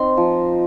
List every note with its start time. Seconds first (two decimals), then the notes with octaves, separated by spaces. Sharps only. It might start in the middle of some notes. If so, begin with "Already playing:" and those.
Already playing: C4 D#4 C6
0.17 F3